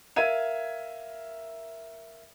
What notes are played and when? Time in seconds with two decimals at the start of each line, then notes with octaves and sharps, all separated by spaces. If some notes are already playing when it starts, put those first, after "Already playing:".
0.16 A#4 E5 F5 G#6 D#7